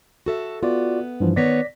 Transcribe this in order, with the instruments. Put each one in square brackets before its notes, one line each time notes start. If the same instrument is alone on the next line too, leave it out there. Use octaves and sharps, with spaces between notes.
[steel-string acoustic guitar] F#4 A4 E5
[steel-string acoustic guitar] B3 [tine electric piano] F4 F#4 D5
[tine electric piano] G2 E3 F3
[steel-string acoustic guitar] D#3 B3 C#5 [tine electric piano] D5 A#6 B6